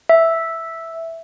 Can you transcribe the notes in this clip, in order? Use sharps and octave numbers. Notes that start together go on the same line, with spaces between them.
E5